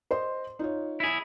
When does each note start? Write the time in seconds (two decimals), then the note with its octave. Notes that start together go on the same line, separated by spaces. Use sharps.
0.11 C5 D#5 C6
0.59 D#4 F4 C#5
1.00 E4 G#4